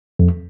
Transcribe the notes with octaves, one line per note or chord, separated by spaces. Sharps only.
F2